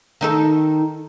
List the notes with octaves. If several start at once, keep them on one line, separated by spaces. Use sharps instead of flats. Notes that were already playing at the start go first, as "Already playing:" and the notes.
D#3 D#4 A4